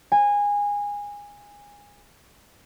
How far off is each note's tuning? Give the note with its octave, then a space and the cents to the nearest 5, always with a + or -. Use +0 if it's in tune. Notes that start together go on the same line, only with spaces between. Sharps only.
G#5 -20